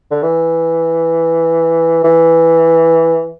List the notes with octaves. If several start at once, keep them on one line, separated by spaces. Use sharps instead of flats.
D3
E3
E3